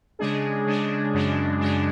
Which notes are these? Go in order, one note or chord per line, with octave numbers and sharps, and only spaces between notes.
C#3 G#3 D4 G#4
C#3 G#3 D4 G#4
F#2 C#3 G#3 D4
F#2 C#3 G#3 D4